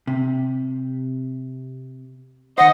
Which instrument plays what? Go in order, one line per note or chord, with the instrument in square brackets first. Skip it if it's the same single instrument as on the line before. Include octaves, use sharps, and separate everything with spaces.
[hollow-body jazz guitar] C3
[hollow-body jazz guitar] D#3 C5 [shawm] D#5 [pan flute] F#5